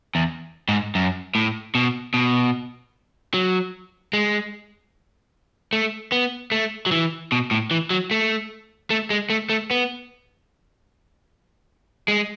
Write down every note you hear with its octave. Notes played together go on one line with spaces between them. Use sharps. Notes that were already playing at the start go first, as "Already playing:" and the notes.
E2
G#2
F#2
A2
B2
B2
F#3
G#3
A3
B3
A3
F#3
E3
B2
A2
E3
F#3
A3
A3
G#3
A3
A3
B3
G#3